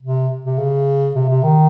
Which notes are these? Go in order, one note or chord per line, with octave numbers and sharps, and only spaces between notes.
C3
C3
C#3
C3
C3
D#3